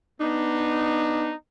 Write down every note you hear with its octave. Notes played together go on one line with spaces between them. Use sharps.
B3 D4 D#4